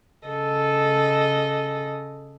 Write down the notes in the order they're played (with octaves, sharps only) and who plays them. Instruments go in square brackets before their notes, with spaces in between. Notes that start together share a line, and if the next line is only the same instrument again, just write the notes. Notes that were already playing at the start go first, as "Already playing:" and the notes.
[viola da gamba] C#3 A4 D#5